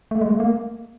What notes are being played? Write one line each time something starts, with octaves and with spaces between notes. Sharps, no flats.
A3
G#3
A3
A#3